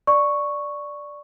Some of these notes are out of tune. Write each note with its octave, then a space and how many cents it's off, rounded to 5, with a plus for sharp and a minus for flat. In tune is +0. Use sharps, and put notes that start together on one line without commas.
D5 +0 C#6 +0